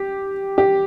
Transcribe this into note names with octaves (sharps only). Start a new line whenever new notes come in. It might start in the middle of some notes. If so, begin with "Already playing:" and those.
Already playing: G4
G4